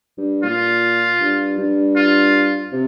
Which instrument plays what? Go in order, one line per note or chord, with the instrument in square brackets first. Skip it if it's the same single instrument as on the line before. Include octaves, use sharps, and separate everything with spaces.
[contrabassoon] G2
[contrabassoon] A#2 [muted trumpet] F4
[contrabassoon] G2
G2
[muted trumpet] F4
[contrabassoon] C3